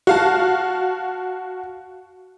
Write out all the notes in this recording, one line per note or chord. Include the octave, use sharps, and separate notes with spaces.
F#4 F5 A5